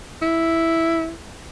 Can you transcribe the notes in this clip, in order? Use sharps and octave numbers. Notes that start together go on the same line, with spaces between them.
E4